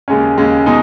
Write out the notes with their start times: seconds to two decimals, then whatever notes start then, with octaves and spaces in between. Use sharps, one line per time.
0.08 D#2 C#3 G#3 C#4
0.38 D#2 C#3 G#3 C#4
0.66 B2 G#3 D#4